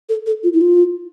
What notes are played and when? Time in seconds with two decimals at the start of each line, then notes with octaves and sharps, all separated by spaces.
0.09 A4
0.26 A4
0.43 F4
0.53 E4
0.61 F4